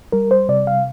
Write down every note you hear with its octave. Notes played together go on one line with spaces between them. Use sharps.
G3 A#4
C5
C3 D5
F5